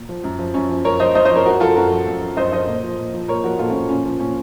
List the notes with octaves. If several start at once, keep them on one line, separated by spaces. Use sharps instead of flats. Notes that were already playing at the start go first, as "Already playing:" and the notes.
Already playing: A#2
F3
F#2
F3
F#2 C#4
F3
F#2 A#4 C#5
F3 C5 D#5
F#2 C5 D#5
C5 D#5
F3 A#4 C#5
F#2 F#4 A#4
F3 F4 A4
F#2 F#4 A#4
F3
F#2
F3
F#2 C5 D#5
F3 C5 D#5
A#2
F3
A#2
F3
A#2 A#4 C#5
F3 F#4 A#4
A#2 F4 A4
C#4 F4
F3
A#2 C#4 F4
F3
A#2 C#4